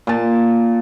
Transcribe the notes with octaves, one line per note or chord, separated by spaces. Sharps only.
A#2 A5